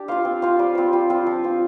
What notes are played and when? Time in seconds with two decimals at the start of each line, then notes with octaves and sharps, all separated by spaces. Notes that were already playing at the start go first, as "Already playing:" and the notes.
Already playing: D4 G4
0.08 F4 C5 F5
0.25 C4
0.42 F4 C5 F5
0.59 G3
0.75 C4 F4 C5
0.93 G3
1.10 C4 F4 C5
1.27 F3
1.44 C4 F4